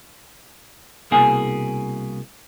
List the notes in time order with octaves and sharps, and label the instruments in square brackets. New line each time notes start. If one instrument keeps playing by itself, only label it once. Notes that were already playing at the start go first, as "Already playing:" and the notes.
[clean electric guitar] C2 B2 A#3 E4 G#4 G#5